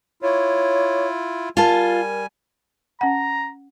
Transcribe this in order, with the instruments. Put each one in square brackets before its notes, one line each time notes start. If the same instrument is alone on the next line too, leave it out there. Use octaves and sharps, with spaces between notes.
[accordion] E4 F4 [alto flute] C#5
[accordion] G3 G#5 [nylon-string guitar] F4 A5 [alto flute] A#4
[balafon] C#4 F#5 [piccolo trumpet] A#5